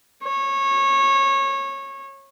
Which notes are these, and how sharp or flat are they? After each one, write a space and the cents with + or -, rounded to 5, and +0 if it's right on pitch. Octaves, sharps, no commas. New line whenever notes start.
C#5 -20